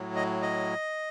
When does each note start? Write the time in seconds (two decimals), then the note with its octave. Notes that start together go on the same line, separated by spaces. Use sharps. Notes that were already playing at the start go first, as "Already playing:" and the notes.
Already playing: A2 F#3
0.16 D#5
0.42 D#5